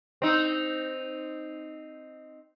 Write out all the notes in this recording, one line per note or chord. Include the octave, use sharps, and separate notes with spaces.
C4 D#4